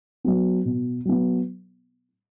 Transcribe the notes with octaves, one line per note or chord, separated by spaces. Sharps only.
F#3 B3
B2
F#3 B3